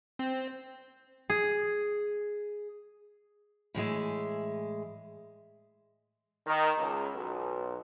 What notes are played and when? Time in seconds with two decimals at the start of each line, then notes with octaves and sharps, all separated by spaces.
0.19 C4
1.30 G#4
3.75 A2 E3 G#3 E5
6.47 D#3
6.78 C#2
7.15 B1